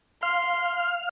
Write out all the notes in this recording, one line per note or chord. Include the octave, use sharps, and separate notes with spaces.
F5 C6 F6